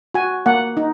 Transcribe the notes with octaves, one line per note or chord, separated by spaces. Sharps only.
F#4 G#5
A#3 F#5
D#4